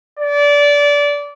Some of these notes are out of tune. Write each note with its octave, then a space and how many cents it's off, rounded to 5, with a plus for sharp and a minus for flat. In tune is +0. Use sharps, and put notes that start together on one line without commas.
D5 -20